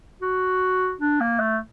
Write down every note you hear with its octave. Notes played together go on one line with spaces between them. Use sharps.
F#4
D4
A#3
A3